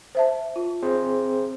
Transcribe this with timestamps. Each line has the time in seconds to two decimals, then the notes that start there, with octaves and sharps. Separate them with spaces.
0.15 C5 E5 A5
0.56 F4
0.83 C4 G#4 C5